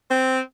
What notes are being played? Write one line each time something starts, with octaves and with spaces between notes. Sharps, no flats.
C4